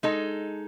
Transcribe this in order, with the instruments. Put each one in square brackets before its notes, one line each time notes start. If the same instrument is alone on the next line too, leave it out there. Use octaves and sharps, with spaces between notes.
[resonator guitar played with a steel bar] G#3 D#4 A4